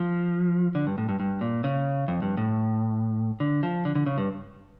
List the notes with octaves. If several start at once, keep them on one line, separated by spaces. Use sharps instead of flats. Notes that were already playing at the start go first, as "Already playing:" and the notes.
Already playing: F3
D3
G2
A2
G2
G2
A#2
C#3
F2
G2
A2
D3
F3
D3
D3
C#3
G2